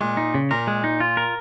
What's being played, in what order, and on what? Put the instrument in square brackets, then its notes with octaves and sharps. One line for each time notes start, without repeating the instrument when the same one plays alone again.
[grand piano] A#2 [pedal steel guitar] G#3
[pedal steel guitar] D#4
C#3
[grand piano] A#2 [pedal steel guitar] A#4
[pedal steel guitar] G#3
D#4
F4
A#4